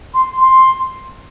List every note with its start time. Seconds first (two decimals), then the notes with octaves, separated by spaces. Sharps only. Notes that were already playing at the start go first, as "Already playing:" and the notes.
0.14 C6
0.41 C6